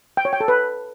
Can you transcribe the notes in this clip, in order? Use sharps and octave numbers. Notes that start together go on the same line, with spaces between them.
G5
C#5
G5
A4
B4